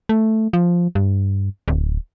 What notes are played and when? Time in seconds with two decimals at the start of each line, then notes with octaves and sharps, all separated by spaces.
0.09 A3
0.53 F3
0.95 G2
1.68 D1